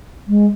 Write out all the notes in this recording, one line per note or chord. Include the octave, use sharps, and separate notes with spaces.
G#3